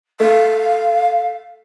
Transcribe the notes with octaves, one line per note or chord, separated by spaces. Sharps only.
A3 F5